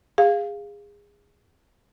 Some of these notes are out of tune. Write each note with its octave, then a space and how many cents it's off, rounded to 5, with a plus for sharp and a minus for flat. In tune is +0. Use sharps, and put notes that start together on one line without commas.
G#4 -25 F5 +0